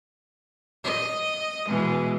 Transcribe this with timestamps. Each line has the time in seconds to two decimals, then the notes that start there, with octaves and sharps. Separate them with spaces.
0.84 D#5
1.67 B2 E3 G#3